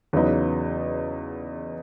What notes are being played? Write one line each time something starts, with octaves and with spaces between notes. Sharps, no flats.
E2 C#3 F#3 B3 D#4